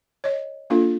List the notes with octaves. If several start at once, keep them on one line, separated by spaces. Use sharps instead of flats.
C#5 D#5
A#3 D4 F4 A4